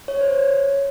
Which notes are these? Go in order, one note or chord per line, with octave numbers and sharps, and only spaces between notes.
C#5
C5
C#5